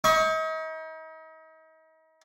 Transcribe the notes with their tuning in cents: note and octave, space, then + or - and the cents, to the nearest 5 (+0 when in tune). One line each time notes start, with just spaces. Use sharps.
D#4 +40 C#6 +0